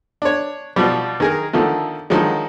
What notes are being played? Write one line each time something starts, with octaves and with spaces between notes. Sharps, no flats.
D4 C#5
B2 F3 G3
D#3 G#4 A#4
D3 D#3 F3 A3
D3 D#3 F3 F#3 G#3